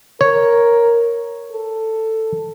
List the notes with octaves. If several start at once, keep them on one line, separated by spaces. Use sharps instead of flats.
A#4 C#5
A4